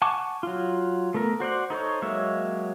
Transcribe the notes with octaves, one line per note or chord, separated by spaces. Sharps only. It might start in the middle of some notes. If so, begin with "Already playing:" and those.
F#5 G#5 A5 C#6 D6
F#3 F4
A3 B3 A4 A#4
F#4 C5 D5 F#5
D#4 A4 C5 C#5
F#3 G#3 A#3 C#5 E5